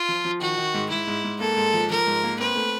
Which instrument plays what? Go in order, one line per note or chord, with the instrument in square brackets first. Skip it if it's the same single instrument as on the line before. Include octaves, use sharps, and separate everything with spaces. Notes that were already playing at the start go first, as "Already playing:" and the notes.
Already playing: [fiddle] F4
[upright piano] F3
F3
[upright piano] D#3 [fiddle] F#4
[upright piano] D#3
G#2
[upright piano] G#2 [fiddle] E4
[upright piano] G#2
G#2
[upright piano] A#3 [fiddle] A4
[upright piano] G#2
F3
[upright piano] F3 [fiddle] A#4
[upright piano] G#2
A#3
[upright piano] C4 [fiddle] B4
[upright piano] A3